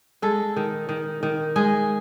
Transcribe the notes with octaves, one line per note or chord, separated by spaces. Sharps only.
G#3 A4
D#3
D#3
D#3
G#3 G#4